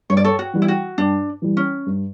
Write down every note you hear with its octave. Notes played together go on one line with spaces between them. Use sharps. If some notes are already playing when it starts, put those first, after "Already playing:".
G2 C#5
D5
A4 C#5
F#4
E3 G3
E4
F#4
G2 D4
E3 G3
C#4
G2